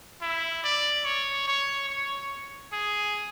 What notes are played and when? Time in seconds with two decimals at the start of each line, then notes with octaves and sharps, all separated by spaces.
0.22 E4
0.64 D5
1.05 C#5
1.47 C#5
1.89 C#5
2.72 G#4